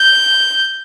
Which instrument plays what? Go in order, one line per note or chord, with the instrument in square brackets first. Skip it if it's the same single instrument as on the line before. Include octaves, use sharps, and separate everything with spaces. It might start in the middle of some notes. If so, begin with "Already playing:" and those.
Already playing: [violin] G6